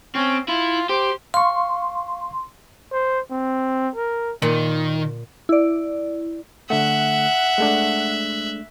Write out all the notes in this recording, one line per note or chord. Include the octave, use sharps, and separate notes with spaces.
C4 C#4
E4 F4
G4 C5
F5 C6 C#6
C5
C4
A#4
A#2 D#3
E4 D5
D3 A3 E5 F#5 F#6
G#3 A3 D4